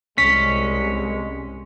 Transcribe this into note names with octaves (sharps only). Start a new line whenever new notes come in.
C2 G#3 C#4 B6